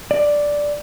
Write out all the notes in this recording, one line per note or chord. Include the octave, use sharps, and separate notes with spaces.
D5